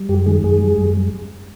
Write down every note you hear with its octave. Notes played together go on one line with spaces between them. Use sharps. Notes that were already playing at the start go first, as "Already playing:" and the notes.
Already playing: G3
F#2 G4
D#3 G#3 G#4
F#2 G#3 G#4
G3
F#2